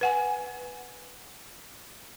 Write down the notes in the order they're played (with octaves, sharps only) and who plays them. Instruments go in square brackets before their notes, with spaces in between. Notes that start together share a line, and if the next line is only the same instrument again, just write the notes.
[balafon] B4 F#5 G#5